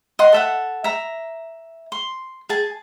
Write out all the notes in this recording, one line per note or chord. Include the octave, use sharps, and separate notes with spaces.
D#5 F#5 C6
A4 E5 F#5
E5 A#5
C6
G#4 G#5 A5